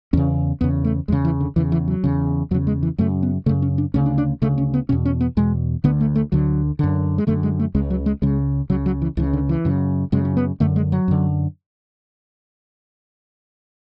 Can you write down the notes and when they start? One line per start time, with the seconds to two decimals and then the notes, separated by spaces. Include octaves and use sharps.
0.13 E2 C#3 C#4
0.61 E2 C#3 B3
0.84 A3
1.08 E2 C#3 G#3
1.25 E3
1.40 D3
1.56 E2 C#3 E3
1.72 E3
1.88 F#3
2.04 E2 C#3
2.51 E2 F#3
2.54 C#3
2.67 G#3
2.83 E3
2.98 F#2 C#3 A3
3.23 B3
3.46 F#2 C#3 A3
3.62 C#4
3.78 D4
3.94 D2 C#3 C#4
4.06 D4
4.18 D4
4.42 D2 C#3 A3
4.58 C#4
4.74 B3
4.89 E2 B2 C#4
5.05 C#4
5.21 B3
5.37 E2 B2 G#3
5.84 D2 D3 B3
6.00 A3
6.16 A3
6.32 D2 D3 F#3
6.79 F#2 D3
7.18 G#3
7.27 F#2 D3 A3
7.43 G#3
7.59 A3
7.75 C#2 C#3 G#3
7.90 F#3
8.06 G#3
8.22 C#2 C#3 G#3
8.70 C#2 C#3 F#3
8.86 F#3
9.02 E3
9.17 C#2 C#3 E3
9.33 D3
9.49 E3
9.65 F#2 C#3
10.12 F#2 C#3 G#3
10.25 C#4
10.37 B3
10.60 F#2 D3 A3
10.76 G#3
10.92 F#3
11.08 F#2 D3